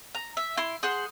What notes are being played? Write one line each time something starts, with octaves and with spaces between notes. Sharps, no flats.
A#5
E5
E4 C6
G#4 C5 F#5 C6